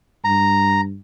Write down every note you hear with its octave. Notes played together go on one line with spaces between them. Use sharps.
G2 A#5